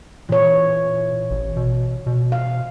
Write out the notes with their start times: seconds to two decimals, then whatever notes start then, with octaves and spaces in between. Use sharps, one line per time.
0.29 A#2 E3 C#5
1.31 A1
1.56 B2
2.06 B2
2.32 F5